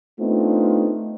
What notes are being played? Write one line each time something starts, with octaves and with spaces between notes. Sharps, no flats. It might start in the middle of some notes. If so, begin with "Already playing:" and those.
A3 B3 C4 D4 D#4 F4